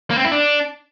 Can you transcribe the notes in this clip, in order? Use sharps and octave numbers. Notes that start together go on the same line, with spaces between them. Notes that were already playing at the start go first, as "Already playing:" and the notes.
A#3
C4
E4
D4